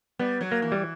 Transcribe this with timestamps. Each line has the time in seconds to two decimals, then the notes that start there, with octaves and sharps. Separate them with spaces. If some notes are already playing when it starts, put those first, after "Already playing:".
0.19 G3 B3
0.41 F#3
0.52 A#3
0.62 E3
0.72 G3